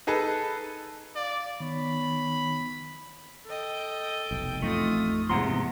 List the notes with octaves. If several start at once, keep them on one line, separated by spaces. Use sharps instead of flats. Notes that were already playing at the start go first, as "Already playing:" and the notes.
D#4 G#4 A4 B4
D5 F5
D#3 B3 C#5 B5 C#6
A4 D#5 G5
F1 B1
A1 F2 A3 D#4 F4 D#6
E2 G#2 C3 F3 F#5 A#5 C6